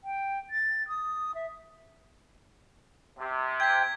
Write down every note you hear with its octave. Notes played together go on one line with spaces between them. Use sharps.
G5
A6
D#6
E5
C3
G5 G#6 B6